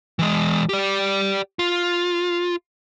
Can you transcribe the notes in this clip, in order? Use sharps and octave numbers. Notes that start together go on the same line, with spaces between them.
E3 G#3
G4 D5
F4